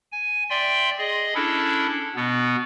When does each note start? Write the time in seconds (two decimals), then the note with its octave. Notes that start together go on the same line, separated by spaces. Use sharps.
0.12 G#5
0.50 D5 E5 G5 C6
0.98 G#4 D#5
1.35 C#4 D4 E4 A4
2.16 B2 B3